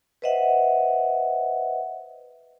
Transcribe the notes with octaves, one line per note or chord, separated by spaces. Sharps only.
B4 C5 D#5 E5 F#5